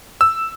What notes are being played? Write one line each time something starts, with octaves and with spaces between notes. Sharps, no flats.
E6